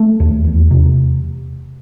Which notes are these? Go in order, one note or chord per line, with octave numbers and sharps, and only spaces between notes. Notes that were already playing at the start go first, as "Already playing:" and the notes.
Already playing: A3
D#2
E2
C3